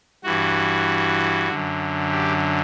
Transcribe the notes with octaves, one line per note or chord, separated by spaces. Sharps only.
G2 E3 F#4
F#2 D3
G4